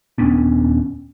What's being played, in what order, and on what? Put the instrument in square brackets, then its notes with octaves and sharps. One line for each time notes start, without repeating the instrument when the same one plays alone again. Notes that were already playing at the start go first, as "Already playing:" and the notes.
[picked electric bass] D#1 B3 C#4 D4